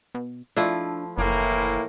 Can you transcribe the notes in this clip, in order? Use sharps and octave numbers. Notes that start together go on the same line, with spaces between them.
B2
F3 A3 D4 E4
F#1 A2 E3 A#3